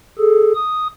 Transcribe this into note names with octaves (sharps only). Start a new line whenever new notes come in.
G#4 A4
D#6